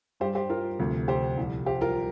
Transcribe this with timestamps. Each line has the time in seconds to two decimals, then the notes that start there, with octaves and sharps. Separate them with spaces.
0.20 G2 G3 G4 C5
0.35 G4 C5
0.50 F4 A#4
0.79 D2 C3 F3
1.08 G4 C5
1.37 C2 A#2 F3
1.66 G4 C5
1.81 F4 A#4